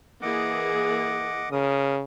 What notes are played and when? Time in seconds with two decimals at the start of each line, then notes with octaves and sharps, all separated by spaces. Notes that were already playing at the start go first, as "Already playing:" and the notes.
0.22 E3 A#3 G#4 D#5 F#5 D6
1.52 C#3 A#4 D#6